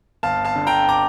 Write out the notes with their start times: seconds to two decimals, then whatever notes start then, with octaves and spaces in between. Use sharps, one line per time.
0.23 G1 F5 A5
0.45 F5 A5
0.56 D3
0.67 G5 A#5
0.89 A#5 D6